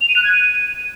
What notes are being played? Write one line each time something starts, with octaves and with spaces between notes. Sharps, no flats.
F7
D#7
F#6
G#6
D#7